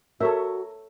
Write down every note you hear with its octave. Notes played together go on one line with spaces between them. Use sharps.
F#4 A4 A#4 C#5 E5